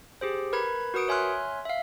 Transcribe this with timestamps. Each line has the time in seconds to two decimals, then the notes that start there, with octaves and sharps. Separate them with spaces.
0.21 G4 G#4 C5
0.53 A#4 B4 B5 G#6
0.94 F#4 A#4 B4 D#6 C#7 D7
1.08 C#5 E5 G#5 C6 F6 F#6
1.65 E5 F5